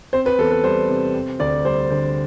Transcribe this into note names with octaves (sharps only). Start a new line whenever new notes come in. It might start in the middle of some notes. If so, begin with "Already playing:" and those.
C4 C5
B4
E2 A4
B4
G3 C5
C3
C4
D2 D5
G3 C5
D3 C5